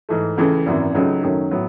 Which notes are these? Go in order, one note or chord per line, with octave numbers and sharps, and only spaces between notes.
G#2 E3 A3
C#2 C#3 E3 A3
G#1 F#2 E3
C#2 C#3 F#3 A3 D#4
F#2 D#3 F#3 A3 C#4
A2 F#3 B3